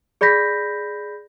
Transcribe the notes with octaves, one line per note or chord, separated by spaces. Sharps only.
G#4 D5 B5 G6 A#6 B6